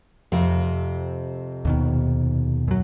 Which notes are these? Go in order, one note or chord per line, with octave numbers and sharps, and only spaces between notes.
F2 C3
D#2 B2 D#3
F#2 F#3